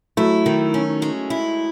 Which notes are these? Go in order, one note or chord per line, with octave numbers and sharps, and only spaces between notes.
F#3 A3 E4
D#3
C#4
G#3
E4